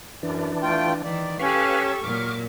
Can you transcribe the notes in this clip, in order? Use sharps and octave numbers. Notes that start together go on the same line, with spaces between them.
F#2 E3 D4
A3 F4 G5
D#3 E3 D5
C#4 G4 A4 B4 F5 C#6
A#2 F#3 D6 F6